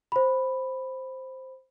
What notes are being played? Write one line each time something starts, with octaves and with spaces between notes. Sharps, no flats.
C5 B5